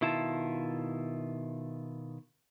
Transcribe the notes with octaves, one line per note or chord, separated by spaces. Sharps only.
B2 D#3 E4 F4 A5